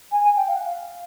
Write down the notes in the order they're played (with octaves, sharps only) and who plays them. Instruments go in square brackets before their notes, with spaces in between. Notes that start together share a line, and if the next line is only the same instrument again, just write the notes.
[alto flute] G#5
G#5
G5
F5
F#5
F5